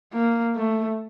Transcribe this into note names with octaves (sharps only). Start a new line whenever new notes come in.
A#3
A3